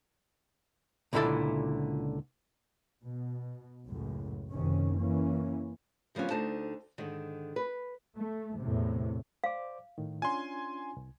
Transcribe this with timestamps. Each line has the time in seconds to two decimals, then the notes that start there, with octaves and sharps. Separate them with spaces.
1.13 C#2 A#2 D3 E4 A4 D5
3.05 B2
3.86 C#2 F#2 A2
4.51 F#1 F#2 C3 D#3 C#4
4.99 E3 A#3 C#4
6.15 C#3 F3 G3 B3 C#4
6.30 D2 D3 D#4 C5 A5
6.98 G#2 D3 D#3
7.56 B4
8.18 A3
8.60 E2 A2 C3
9.44 C5 D5 F5 D6
9.98 A2 D#3
10.22 C#4 D4 F4 G#5 C6
10.97 C2